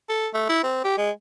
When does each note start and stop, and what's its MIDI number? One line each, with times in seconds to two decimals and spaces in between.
0.09 0.28 69
0.34 0.47 57
0.49 0.62 64
0.63 0.81 60
0.84 0.95 67
0.98 1.10 56